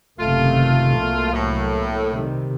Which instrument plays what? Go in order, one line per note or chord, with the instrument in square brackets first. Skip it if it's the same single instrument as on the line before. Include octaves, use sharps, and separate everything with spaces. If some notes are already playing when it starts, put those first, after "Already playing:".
[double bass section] F#1 C3 D#3 [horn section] A3 F4
[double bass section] C2 F#3 A#3
[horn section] A2
[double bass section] C3 D#3 G3